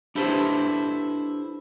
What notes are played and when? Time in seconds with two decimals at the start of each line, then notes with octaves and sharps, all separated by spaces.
0.15 D4 E4 G4 A4 B4 C5